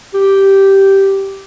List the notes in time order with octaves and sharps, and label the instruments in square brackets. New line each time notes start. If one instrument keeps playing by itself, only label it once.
[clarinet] G4